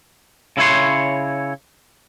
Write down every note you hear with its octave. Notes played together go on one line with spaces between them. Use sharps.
C#3 E4 C#5 C6